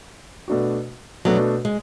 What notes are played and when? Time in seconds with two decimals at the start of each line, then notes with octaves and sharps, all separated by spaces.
0.48 B2 A3 D4 F#4
1.25 B2 F#3 A3 D4 F#4
1.65 G#3